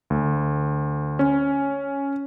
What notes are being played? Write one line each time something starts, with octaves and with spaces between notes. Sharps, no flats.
D2
C#4